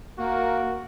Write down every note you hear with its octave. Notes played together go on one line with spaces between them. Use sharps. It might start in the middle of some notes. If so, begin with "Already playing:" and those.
A#3 F#4 A#4